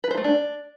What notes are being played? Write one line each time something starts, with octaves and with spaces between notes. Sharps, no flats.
B4
C5
A3
D4